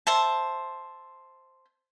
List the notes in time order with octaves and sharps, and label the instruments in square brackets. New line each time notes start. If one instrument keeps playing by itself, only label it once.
[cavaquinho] C5 E5 A5